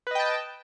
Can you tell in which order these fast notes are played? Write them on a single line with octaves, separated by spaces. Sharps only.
B4 D#5 G5 A5